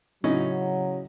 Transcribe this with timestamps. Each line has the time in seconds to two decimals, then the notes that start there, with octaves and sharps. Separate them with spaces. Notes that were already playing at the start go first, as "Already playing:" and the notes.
0.24 A2 C#3 F#3 C#4 D#4